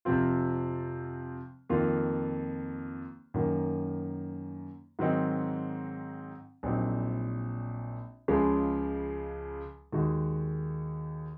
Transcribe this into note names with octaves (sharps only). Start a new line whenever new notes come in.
F2 C3 F3 C4 F4
F2 D#3 A#3 F4
F#2 D#3 A#3
G#2 D#3 F#3 C4 D#4
A#1 A#2 F#3 C4 D#4
C#2 C#3 F3 G#3
D#2 D#3 G#3 D#4 F#4